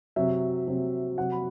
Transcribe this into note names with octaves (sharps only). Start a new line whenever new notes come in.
C3 F#3 E5
C3 F#3
C3 F#3 F#5
B5